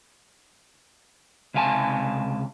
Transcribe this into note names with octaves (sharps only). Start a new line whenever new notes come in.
C#2 C3 F5 G#5 A5